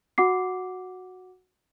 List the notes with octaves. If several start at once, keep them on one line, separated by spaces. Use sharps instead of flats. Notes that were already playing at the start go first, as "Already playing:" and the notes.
F#4 F#5 D6 C7